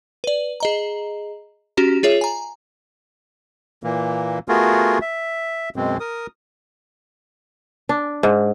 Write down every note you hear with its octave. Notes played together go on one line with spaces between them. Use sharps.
B4 D5
G#4 D#5 A#5
C#4 F#4 G4 A#5
F4 G#4 C#5 E5
G#5 A#5
A#2 E3 A#3
A3 B3 F4 F#4 G#4 A#4
E5
F#2 B2 G#3 C4
A#4 D#6
D4
G#2